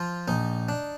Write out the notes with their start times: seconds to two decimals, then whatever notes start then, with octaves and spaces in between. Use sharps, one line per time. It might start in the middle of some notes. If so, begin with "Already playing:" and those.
Already playing: F3 F4
0.28 A#1 D#4
0.69 D4